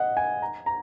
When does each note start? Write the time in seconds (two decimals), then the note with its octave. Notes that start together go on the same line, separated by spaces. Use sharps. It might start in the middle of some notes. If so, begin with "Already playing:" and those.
Already playing: D#5 F#5
0.17 G#5
0.42 A#5
0.66 A#5